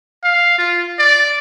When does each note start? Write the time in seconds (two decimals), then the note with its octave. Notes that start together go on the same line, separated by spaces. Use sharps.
0.24 F5
0.58 F4
0.99 D5